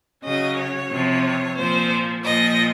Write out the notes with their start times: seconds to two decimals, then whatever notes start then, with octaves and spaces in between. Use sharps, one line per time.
0.23 C#3 F#3 D#5
0.57 C#5
0.90 C3 F3
1.57 A#2 F3 C5
2.23 A#2 F3 D#5